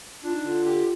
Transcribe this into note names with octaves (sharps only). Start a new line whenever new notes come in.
D4 F4
D#4
D3 F4
G4